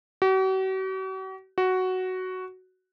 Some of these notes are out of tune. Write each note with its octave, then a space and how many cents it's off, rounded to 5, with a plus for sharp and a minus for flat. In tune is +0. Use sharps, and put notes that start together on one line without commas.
F#4 +45
F#4 +5